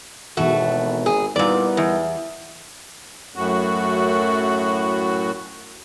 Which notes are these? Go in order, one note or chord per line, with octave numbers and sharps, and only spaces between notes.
G#1 B2 E3 A3 F#4
G#4
A#2 G3 B3 D#4 E4 A#4 D5
E2
F#2 A2 F#4